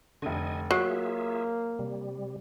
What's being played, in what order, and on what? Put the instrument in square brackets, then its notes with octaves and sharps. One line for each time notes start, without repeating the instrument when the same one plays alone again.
[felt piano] F1 D3 [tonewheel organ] D#5 G#5
[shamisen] F#3 [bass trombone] A#3 [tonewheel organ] F4 G#4 E5 [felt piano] C7
[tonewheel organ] C3 G3